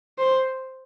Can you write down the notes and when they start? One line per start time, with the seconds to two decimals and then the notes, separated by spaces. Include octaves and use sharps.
0.19 C5